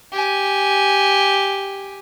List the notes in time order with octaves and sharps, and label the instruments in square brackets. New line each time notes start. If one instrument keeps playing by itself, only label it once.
[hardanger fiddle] G4 G#5